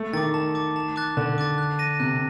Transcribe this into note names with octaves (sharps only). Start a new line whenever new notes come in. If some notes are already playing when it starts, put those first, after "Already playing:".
Already playing: A3
D#3 D6 A6
A5
D6 A6
A5
D6 F#6 A6
D3 A5
D6 F#6 A6
F#6
A#6 D#7
C3 F#6